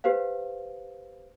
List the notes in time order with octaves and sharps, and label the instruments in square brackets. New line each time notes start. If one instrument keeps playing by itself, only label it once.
[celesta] G4 B4 C5 F5